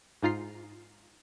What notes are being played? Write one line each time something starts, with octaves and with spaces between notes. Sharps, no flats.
G#2 D#4 F4 A#5 C7